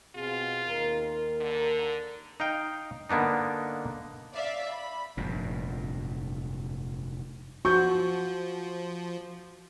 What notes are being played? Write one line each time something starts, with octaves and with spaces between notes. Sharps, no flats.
B2 C4 F4 G#4
D#2 A#4
D3
D#4 F5 G5
D3 A#3 B3 D4 D#4
D5 E5 F5
B5
F1 G2 A#2
F3 F#4 C#6 G6